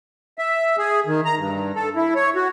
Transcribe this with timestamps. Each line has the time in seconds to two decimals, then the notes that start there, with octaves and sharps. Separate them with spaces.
0.39 E5
0.78 G#4
1.06 D#3
1.25 A#5
1.38 G2
1.76 A4
1.96 E4
2.15 C#5
2.36 F#4